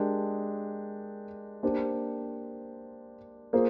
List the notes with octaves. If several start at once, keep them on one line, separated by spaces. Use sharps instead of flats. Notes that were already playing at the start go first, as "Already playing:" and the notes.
Already playing: G#3 D4 G4 A#4
A#3 D4 G4 C5
A#3 F4 G#4 C5